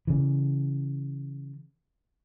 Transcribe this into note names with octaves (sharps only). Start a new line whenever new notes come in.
C#3 E3